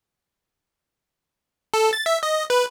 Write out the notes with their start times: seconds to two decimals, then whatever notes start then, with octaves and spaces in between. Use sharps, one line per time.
1.74 A4
1.93 A6
2.06 E5
2.23 D#5
2.50 B4